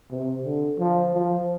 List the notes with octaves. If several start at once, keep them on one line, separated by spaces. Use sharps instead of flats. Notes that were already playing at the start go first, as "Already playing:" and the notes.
C3
D3
F3
F3